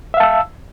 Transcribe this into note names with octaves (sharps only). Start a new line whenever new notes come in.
E5 F5 A5 E6